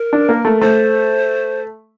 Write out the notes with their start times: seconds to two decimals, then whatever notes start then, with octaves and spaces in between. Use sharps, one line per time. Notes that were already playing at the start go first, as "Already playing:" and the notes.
Already playing: A#4
0.13 D4
0.29 A#3
0.45 A3
0.61 A3 C5